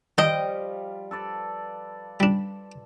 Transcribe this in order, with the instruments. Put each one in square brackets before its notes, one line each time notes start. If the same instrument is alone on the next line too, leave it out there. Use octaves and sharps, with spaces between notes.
[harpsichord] D#3 [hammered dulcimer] F3 G3 F5 [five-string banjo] D#5 G5
[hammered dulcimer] A4 B4 D5
[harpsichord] G3 D4